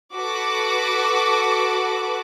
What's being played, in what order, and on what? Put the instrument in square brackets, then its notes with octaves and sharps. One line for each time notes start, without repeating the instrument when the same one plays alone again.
[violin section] F#4 A4 B4 D6